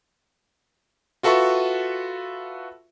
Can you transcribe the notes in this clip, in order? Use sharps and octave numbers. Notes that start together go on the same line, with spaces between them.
F4 F#4 A4 B4 E5 C#6